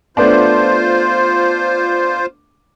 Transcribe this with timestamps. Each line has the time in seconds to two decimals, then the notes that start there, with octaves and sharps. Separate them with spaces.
0.17 A3 B3 D4 F4 C5